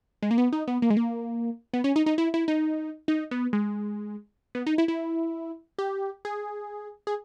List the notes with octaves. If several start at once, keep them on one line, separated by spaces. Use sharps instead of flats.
G#3
A#3
B3
D#4
B3
A#3
G#3
A#3
B3
C#4
D#4
D#4
E4
E4
D#4
D#4
B3
G#3
B3
D#4
E4
E4
G4
G#4
G#4